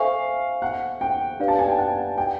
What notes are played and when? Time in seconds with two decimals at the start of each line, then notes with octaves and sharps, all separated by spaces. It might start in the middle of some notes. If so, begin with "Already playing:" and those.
Already playing: A4 C5 E5 F5 G#5 C#6
0.62 F#5
1.01 G5
1.39 D4 G4 B4 D5 F5
1.48 A5
1.59 G#5
1.68 G5
1.78 F#5
2.18 G5